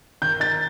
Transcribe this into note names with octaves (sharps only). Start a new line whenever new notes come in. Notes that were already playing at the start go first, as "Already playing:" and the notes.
D#3 G6
D#4 A6